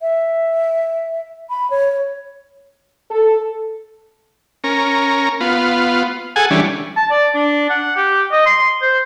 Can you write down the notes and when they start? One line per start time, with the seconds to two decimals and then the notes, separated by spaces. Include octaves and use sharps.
0.01 E5
1.50 B5
1.70 C#5
3.10 A4
4.64 C#4 A#4
5.40 B3 F4
6.36 G#4 A4 F#5 G#5
6.50 E3 G3 C#4 D4
6.96 A5
7.11 D5
7.35 D4
7.70 F#5
7.97 G4
8.32 D#5
8.46 C6
8.82 C5